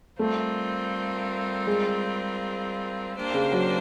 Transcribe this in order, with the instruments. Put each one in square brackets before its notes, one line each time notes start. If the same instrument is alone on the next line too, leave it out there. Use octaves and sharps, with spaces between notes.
[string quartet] G3 C4 F4 A#4 [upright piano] A3
[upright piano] G#3
[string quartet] A#3 D4 G4 C5
[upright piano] C#3
F#3